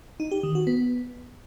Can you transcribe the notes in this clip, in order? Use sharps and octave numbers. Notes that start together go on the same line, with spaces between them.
D#4
G4
D#3
F#4
B3